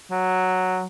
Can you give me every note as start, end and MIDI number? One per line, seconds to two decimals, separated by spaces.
0.11 0.86 54